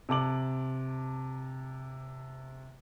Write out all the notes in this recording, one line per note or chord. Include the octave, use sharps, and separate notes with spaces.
C3 A5 D6 F#7